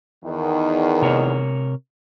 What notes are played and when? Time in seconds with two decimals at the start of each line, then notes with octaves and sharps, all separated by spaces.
0.24 E2 D#3
1.02 C3 A#4 C#5